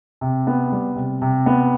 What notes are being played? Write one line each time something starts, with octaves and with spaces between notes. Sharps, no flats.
C3
B3
G3
C3
C3
B3